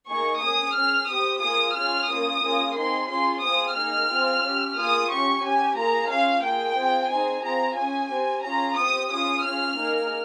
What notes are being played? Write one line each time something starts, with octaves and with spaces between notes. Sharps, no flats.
A#3 D#4 G#4 C#6
C#4 G#4 D#6
C#4 G#4 F6
C4 G4 D#6
A#3 F4 G#4 D#6
C#4 F4 G#4 F6
A#3 C#4 F4 D#6
A#3 C#4 F4 G#4
C4 D#4 G#4 C6
C#4 F4 G#4 C6
C4 F4 G#4 D#6
A#3 D#4 G#4 F6
C4 F4 G#4
C#4
G4
A#3 F4 G#4 D#6
C#4 G4 C#6
C#4 G4 G#5
A#3 F4 G#4 A#5
C#4 F4 G#4 F5
A#3 F4 G#4 G5
C4 F4 G#4
C4 D#4 G#4 G#5
C4 F4 G#4 A#5
C#4 G#4 G#5
C4 G4
C#4 F4 G#4 A#5
C4 G4 D#6
C#4 F4 G#4 D#6
C#4 F4 G#4 F6
A#3 D#4 G#4